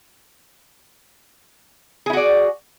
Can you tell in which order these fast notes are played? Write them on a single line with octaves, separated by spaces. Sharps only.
G#4 E4 F#4 D5